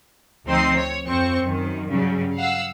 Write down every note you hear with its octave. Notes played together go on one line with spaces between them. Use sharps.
D2 F3 C4 D#4 C6 C7
C#5
F2 C4 C#6
F#2 D#3
G2 C#3 F#3 G3
F5 F#5 E6